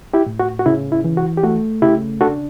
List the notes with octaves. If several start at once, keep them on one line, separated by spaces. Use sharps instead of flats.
E4 G4
A2
F#4
F#4
C#3 E4
E4
E3
F#4
G4
A3 F#4
C#3 E4 G4
D4 F#4 A4